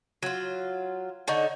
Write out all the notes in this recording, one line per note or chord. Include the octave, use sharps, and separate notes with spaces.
F#3 F4
D3 D#4 C#5